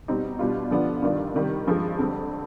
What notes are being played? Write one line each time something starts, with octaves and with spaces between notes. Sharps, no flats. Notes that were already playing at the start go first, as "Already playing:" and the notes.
B2 G3 C4 D#4
B2 G3 D4 F4
D3 F3 B3 D4 F4
G2 D#3 G3 D4 F4
C3 D#3 G3
G2 F3 G#3
F2 D3 G3 C4